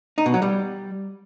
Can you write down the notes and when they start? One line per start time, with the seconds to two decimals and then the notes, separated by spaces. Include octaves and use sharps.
0.18 D#4
0.26 B2
0.34 F#3
0.42 G3